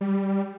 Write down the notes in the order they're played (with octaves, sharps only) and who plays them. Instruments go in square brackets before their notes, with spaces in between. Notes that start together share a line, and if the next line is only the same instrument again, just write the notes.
[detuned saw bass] G3